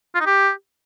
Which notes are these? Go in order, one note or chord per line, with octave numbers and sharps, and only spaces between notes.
F4
D#4
G4